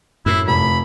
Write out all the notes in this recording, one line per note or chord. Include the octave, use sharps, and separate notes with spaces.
F#2 A2 E4
F1 B5